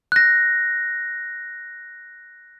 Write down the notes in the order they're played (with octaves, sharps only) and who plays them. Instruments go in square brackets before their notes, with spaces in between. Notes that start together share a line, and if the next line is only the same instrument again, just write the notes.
[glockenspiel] F#6 A#6